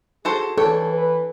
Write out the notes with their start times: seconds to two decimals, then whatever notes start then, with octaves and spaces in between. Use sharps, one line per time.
0.25 F#4 G#4 A4 C5
0.58 E3 A4 C#5 G5
0.92 B4